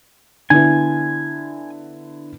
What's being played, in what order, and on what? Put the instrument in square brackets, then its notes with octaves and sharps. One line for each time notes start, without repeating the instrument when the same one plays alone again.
[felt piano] D3 B3 E4 [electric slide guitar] G#5